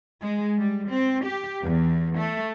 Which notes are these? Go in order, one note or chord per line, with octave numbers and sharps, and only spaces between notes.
G#3
G3
C4
G4
E2
A3